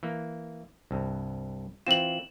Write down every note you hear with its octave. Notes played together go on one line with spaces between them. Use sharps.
E3 A#3
C2 G2
E3 C4 F4 E7 F#7